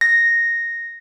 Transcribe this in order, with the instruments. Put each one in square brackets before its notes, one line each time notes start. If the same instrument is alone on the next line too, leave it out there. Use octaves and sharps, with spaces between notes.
[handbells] A#6